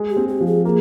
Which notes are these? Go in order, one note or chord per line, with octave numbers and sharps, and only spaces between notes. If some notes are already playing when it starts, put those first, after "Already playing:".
Already playing: G#3
G4
C4
G4
F3
G#4
A#3 G#4